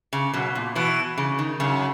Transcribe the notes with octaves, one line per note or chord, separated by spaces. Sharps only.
C#3
F#2 B2
A#2
B2 E3
C#3
D#3
F#2 C#3